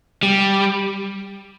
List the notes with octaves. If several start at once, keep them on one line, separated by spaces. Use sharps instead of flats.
G3